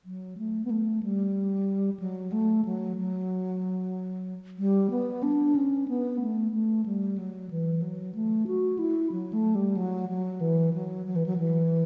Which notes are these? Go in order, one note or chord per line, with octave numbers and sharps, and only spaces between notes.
F#3
A3
B3
A3
G3
F#3
A3
F#3
F#3
G3
B3
D4
C#4
B3
A3
A3
G3
F#3
E3
F#3
A3
F#4
E4
F#3
A3
G3
F#3
F#3
E3
F#3
F#3
E3
F#3
E3